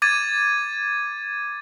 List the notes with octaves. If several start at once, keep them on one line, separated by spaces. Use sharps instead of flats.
D6 G#6 A6 D#7